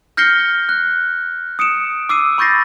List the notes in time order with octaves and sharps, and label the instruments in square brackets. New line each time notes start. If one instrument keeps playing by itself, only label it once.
[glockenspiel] F6 G6 A#6 C7 C#7 G7
F#6
D#6 C#7 D7 E7
D6 E6 C7 D#7
B5 C#6 G6 A6 A#6 C7